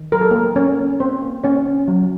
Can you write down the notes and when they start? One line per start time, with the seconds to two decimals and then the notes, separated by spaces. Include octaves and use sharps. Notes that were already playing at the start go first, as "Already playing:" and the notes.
Already playing: D#3
0.12 F#3 A#4
0.21 A4
0.31 A3 A#3 A#4
0.56 A#3 C#4 C#5
0.78 C#4
0.99 A#3 C4 C5
1.22 A#3
1.44 A#3 C#4 C#5
1.66 C#4
1.88 F#3